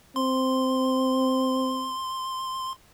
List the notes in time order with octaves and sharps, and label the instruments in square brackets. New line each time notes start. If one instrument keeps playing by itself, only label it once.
[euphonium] C4 [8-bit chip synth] C6